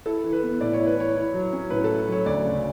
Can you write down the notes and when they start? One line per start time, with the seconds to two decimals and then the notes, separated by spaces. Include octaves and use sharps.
0.06 E4 A4
0.24 E3
0.32 B4
0.43 B3
0.61 A2 D5
0.73 C#5
0.79 E4
0.86 B4
0.97 E3 C#5
1.16 E4
1.34 F#3
1.53 C#4
1.70 A2 B4
1.84 A4
1.89 E4
2.08 F#3 C#5
2.26 D2 D5
2.44 C#3